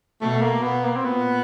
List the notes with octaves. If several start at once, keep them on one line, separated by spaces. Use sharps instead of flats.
B2 A3
A#3
B2 B3
A#3
C4
A#2 B3